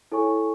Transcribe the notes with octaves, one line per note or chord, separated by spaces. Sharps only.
E4 A4 C#5 G#5 C#6